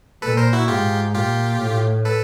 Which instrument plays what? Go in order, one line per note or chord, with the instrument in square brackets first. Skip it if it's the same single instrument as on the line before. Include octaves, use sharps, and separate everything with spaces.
[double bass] A#2 [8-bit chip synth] A4 B4
[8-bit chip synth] A#4 C5
E4 F#4
[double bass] G#2 [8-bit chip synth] F4 G4
[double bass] A#2 [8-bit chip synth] F4 G4
[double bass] A2
[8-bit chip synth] A4 B4